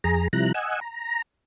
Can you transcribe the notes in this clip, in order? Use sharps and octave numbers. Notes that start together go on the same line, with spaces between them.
F2 G#4 A#5
C3 F3 G3 E4 A#5 F#6
D#5 F#5 G#5 E6
A#5